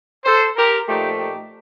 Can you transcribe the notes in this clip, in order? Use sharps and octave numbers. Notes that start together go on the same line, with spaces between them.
A4 C5
G4 A#4
A#2 F3 A3 D#4 G4
D#4 G4